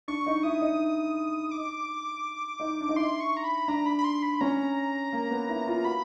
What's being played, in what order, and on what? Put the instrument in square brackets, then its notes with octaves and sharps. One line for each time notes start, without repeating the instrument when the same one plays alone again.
[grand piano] D4 [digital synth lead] C#6
[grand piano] D#4
[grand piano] E4 [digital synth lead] D#6
[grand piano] D#4
[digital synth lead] D6
[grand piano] D#4
D4
D#4
[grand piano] E4 [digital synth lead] C6
[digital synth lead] C#6
A#5
B5
[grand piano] D4 [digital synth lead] A#5
[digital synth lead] B5
B5
C6
B5
[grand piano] C#4 [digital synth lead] A#5
[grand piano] A#3
B3
E4
F4
[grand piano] F#4 [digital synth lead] B5